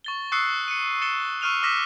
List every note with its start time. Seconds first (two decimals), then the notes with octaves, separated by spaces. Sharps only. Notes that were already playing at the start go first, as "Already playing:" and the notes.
0.04 C#6 A6 G7
0.32 C#6 D#6 E6 F#6 C7 C#7
0.68 C#7 D#7
1.01 A6 C#7 E7 G7
1.41 C#6 E6 F6 D#7 F7 G7
1.63 D6 E6 F6 A#6 B6 E7